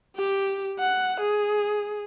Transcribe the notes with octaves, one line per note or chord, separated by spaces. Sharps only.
G4
F#5
G#4